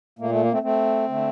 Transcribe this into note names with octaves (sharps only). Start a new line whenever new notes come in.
A#2 A3 A#3
A3
A#3
A3 C4
A3 C4
D3 A3